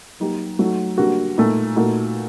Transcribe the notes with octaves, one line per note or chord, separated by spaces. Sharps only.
F#3 A#3 D#4 G4
F#3 A3 D#4 F#4
D3 G3 A#3 F#4
A#2 A3 D#4
A#2 A3 D#4 F#4